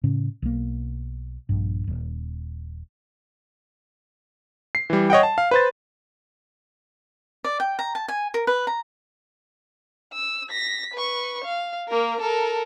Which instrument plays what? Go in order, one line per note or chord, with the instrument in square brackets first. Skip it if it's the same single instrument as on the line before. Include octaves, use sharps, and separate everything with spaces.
[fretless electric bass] A2 C#3 C#4
B1 A#3
A#1 G2
D#1
[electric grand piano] C7
E3 G3
C#5 D#5 F#5 G5
A5
F5
B4 C5 A6
[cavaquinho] D5
G5
A#5
A5
G#5
A#4
B4
A#5
[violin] E6
A#6 B6
B4 C#6
F5
A#3 A#4
A4 A#4